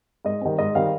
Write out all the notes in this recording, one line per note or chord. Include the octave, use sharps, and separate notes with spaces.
G#2 D#5
D#3 G3 C4
G#2 D#5
D#3 G3 C4 F5